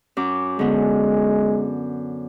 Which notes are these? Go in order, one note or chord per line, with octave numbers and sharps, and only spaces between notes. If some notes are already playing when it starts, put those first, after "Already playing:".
F#2 D6
D3 G#3 B3